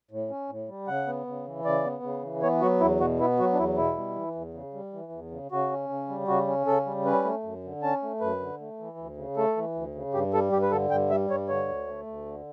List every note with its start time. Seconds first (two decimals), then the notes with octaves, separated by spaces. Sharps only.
0.11 A2
0.30 C#4
0.49 A2
0.69 G3
0.88 C#3 F#5
1.07 B3
1.27 C#3
1.46 E3
1.65 C#3 D5
1.84 B3
2.03 C#3
2.22 E3
2.42 B3 C#5
2.61 F#3 F#4
2.80 E2 E4
3.00 B2 F#4
3.19 B3 E4
3.39 F#3 F#4
3.53 D4
3.58 E2 E4
3.77 B2 E4
3.97 G3
4.16 E3
4.35 E2
4.54 C#3
4.74 G3
4.93 E3
5.12 E2
5.31 C#3
5.52 C#3 F#4
5.71 C#4
5.89 C#3
6.09 G3
6.28 C#3 F#4
6.47 C#4
6.67 C#3 A4
6.86 G3
7.05 C#4 B4
7.25 A3
7.43 F#2
7.64 D3
7.83 C#4 A5
8.02 A3
8.21 F#2 B4
8.40 D3
8.60 A3
8.79 E3
8.98 D2
9.17 C#3
9.36 A3 A4
9.57 E3
9.75 D2
9.95 C#3
10.13 G2 G4
10.33 G3 A4
10.52 G2 G4
10.62 B4
10.71 D3 A4
10.90 G2 G5
11.10 G3 E5
11.30 G2 C#5
11.49 D3 C#5
11.68 D2
11.88 A3
12.06 D2
12.26 D3